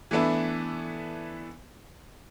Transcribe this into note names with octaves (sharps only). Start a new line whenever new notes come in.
E3 A3 B3 D4 E4